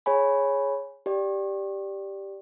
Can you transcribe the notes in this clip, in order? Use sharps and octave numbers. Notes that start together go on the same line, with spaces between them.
G#4 C#5 G#5 B5
G4 D5